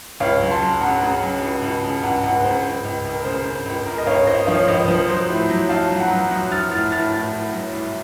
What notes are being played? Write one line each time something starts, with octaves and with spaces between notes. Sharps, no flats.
C#2 C#5 F5
F#3
A5 C6
F#3
C#3 F#5 A#5
C#3
F#3
C#2
C#2
C#3
C#2 F#5 A#5
C#2 F#5 A#5
C#3 C5
C#2
C#2
C#2
A#4
C#3 C5
C#3
C#2
C#2 A#4
D#5
C#2 C#5 F5
C#2 C5 D#5
F3 C#5 F5
C#2 C5 D#5
F3 C5
F#3 C5
A2
F#3
F#3 F5 A5
F#3
F#5 A#5
F#3
F#3 D#6 F#6
F#3 F6 A6
A2 F6 A6
A2 F6 A6
A2
A2
F#3
C2